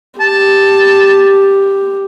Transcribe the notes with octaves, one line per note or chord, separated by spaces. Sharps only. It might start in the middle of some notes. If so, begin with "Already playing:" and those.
G4 A5